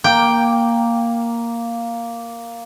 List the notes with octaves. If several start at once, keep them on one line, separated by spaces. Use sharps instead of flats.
A#3 G5